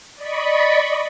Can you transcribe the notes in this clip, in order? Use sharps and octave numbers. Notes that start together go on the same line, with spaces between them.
D5 D#5 B5 C#6